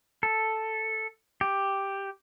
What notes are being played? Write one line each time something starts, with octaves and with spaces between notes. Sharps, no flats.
A4
G4